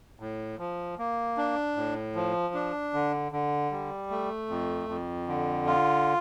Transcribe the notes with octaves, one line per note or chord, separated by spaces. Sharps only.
A2
F3
A#3
D4
A2
F3
D4
D3
D3
G3
A3
F2
F2
D3
F4